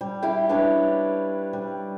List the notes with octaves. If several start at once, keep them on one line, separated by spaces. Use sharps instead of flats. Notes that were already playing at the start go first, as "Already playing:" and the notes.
G3
E4 G4 F5 G5
D4 B4 C#5 F5
G3